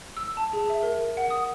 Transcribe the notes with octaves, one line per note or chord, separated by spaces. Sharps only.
E6
A5
G#4
E5
A#4
F#5
D#6